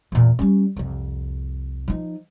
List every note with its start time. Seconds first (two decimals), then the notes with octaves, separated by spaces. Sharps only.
0.12 E2 A#2
0.39 G3 C#4
0.76 C2 F2
1.88 F3 D#4